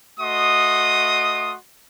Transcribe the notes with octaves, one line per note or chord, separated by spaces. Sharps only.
A3 F#4 D#5 C6 D#6